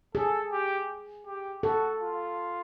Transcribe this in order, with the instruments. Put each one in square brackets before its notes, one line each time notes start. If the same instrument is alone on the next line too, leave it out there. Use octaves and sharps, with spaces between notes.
[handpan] G#4 [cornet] A4
[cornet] G4
G4
[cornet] F#4 [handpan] A4
[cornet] F4